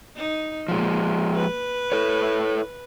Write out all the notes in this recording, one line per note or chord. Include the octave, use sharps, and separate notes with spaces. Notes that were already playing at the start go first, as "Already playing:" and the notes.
D#4
A#2 F3 G#3
B4
E4 A4 C#5